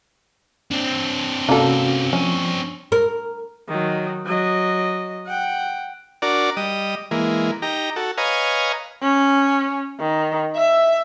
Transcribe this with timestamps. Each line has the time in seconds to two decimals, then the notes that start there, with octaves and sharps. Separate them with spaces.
0.71 C4 D4
1.49 C3 A#3 C#4 F#4 A4
2.13 F3 C#4
2.92 A#4
3.68 D#3 F#3
4.26 F#3 D#5
5.27 F#5 G5
6.22 D4 F#4 A#4 D5
6.57 G3 D#5
7.11 E3 G#3 A#3
7.62 D#4 G4 A#5
7.96 F#4 A4
8.18 B4 C#5 D#5 F5 G#5 A#5
9.03 C#4
10.00 D#3
10.56 E5